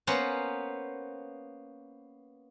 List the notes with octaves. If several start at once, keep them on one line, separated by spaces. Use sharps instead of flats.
A#3 B3 C#4 B4 C5